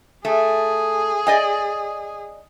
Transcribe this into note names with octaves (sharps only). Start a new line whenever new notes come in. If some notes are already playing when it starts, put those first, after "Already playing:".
A3 G#4
D5 D#5 G#5